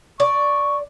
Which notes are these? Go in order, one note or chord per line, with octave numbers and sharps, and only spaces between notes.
D5 C#6